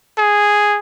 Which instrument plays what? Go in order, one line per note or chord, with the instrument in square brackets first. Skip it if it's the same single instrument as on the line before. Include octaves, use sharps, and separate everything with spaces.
[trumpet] G#4